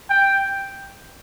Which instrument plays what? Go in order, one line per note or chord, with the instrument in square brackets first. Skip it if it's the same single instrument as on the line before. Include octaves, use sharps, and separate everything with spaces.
[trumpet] G5